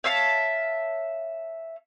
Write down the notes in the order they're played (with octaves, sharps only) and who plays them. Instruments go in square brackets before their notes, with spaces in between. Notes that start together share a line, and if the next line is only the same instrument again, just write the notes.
[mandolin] C#5 E5 F5 A5